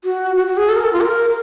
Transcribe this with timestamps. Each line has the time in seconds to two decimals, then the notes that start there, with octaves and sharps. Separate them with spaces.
0.04 F#4
0.36 F#4
0.47 F#4
0.57 G#4
0.69 A4
0.76 A#4
0.85 A4
0.93 F4
1.01 A#4